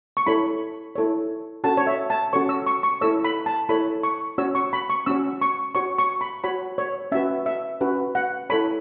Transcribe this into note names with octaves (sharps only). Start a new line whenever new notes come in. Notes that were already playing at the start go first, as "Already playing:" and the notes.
C#6
E4 A4 C#5 B5
E4 A4 C#5
C#4 F#4 A4 C#5 A5
C#5
E5
A5
C#4 F#4 A4 C#5 C#6
E6
C#6
C#6
E4 A4 C#5 E6
B5
A5
E4 A4 C#5 B5
C#6
C#4 F#4 C#5 E6
C#6
B5
C#6
C#4 F#4 C#5 E6
C#6
F#4 C#5 C#6
C#6
B5
F#4 C#5 B5
C#5
C#4 F#4 B4 E5
E5
C#4 F#4 B4
F#5
E4 A4 C#5 B5